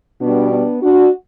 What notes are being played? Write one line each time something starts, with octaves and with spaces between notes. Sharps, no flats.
B2 G3 B3 D4
B3 D4
D4 F#4